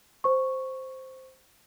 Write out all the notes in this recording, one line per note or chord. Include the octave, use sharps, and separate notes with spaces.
C5 C#6